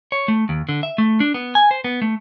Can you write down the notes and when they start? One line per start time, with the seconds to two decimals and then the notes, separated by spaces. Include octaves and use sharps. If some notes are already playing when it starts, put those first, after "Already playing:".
0.12 C#5
0.28 A3
0.49 D#2
0.69 D3
0.83 E5
0.98 A3
1.20 D4
1.34 B3
1.55 G#5
1.71 C5
1.84 B3
2.02 A3